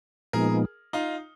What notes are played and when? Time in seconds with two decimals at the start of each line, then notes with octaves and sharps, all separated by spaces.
0.33 A#2 F3 G#3 B3 D#4 G#4 A#4
0.93 D#4 F4